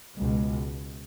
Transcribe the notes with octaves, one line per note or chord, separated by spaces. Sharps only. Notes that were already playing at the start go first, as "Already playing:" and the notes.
C#2 B2 G#3